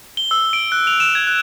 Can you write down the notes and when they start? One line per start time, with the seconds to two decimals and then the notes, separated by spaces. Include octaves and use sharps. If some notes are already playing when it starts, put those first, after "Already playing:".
0.17 G7
0.31 E6
0.53 D7
0.72 F#6
0.87 F7
1.00 E7
1.15 G#6
1.27 F#6